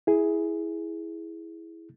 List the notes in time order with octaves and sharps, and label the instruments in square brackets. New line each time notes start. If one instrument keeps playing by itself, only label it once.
[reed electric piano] E4 G#4